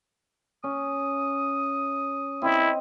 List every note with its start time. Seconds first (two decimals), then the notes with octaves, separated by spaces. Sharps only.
0.64 C#4 D#6
2.42 C4 E4 D#5